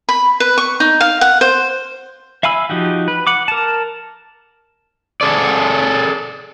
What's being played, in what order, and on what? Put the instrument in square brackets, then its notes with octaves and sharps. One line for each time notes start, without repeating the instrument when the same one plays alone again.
[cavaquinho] B5
B4
C#6
D#4
F5
F#5
C5
[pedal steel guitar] E5 F5 G#5 B5 E6
F3 D#4 F#4 G4
B4
F#5 D6
A#4 A5
[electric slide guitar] G#4 A4 D5